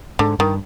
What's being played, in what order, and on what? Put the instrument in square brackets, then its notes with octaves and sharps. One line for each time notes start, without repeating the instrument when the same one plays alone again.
[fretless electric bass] G#2 [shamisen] D3
[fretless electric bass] G2 [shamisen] D#3